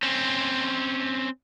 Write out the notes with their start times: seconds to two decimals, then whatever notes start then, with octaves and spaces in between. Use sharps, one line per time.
0.03 C4 C#4